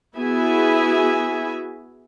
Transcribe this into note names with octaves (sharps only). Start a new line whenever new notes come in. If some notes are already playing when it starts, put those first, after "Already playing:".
B3 E4 F#4 G#4 E5 G#5